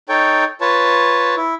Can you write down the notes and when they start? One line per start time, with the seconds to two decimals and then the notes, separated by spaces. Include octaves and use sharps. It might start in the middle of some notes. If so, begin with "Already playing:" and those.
0.09 D#4 A4 C#5 G5
0.61 F4 B4 C#5 A5
1.36 E4